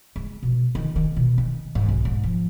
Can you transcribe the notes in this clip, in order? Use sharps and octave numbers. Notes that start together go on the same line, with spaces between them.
G#3
B2
D#3
D#3
B2
D#3
G#2
B1
G#2
F3